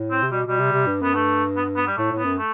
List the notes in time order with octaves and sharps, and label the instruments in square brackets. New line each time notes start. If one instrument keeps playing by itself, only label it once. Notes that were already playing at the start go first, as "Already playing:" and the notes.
Already playing: [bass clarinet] A2
[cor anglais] C4
[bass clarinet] C3
[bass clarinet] B2 [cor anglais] G3
[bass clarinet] B2 [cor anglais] G3
[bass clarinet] C3
C3
G2
[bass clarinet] F#2 [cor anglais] B3
[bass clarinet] G2 [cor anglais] A3
[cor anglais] B3
B3
G3
[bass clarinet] A2 [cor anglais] A3
[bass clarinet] A2
[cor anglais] B3
[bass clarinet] F#2
[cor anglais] A3